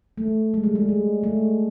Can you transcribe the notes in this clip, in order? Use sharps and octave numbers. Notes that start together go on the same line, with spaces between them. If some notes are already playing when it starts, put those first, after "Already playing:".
A3
G#3
G3
G#3
G3
A3